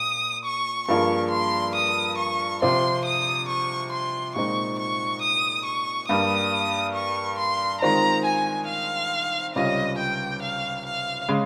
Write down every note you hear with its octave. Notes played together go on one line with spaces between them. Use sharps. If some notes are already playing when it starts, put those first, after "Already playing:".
Already playing: A#2 D#6
C#6
G2 F3 A#3 F4 G#4 C#6
C6
D#6
C#6
C3 F3 C4 F4 C6
D#6
C#6
C6
A#2 G#3 C4 D#4 C#6
C#6
D#6
C#6
G2 G3 A#3 D#6
C#6
C6
D#3 G#3 C4 F4 A#5
G#5
F5
C#2 C3 G3 C#4 F4 D#5
G5
F5
F5
C#3 G#3